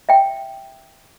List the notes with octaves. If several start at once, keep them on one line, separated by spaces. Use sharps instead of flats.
E5 G5